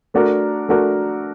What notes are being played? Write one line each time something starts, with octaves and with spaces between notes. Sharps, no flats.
A3 D4 F#4 A#4
A3 D4 F#4 A#4